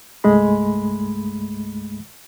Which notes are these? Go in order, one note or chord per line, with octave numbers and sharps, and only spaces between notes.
C2 G2 G#3 A3 B5